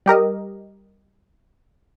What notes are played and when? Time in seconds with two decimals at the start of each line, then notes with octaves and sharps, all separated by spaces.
0.06 G3 G4 A#4 D#5